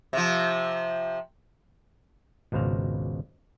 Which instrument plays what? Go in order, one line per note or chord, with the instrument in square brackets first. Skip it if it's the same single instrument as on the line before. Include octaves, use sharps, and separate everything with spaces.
[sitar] C3 F3
[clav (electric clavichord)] G#1 C#2 B2 C5 F5